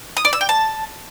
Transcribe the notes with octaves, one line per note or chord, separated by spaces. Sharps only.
D#6
D5
E6
G5
A5